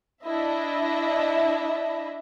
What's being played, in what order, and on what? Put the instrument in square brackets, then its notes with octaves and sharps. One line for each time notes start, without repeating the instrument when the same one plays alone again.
[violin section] D4 E4 D#5 E5